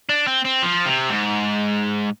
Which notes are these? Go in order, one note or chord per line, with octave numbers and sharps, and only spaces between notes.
D4
C4
C4
F3
C3
G#2